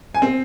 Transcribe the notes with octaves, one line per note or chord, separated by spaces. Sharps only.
G#5
C4